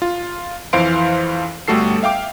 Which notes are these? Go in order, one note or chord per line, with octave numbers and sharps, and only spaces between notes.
F4
F2 E3 C5 F5 C6 D7
G1 G3 A3 F#4 A4 C7
E5 F5 G5 D6